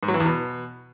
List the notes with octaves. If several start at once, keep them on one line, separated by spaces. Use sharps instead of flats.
G#2
F#3
E3
E2
B2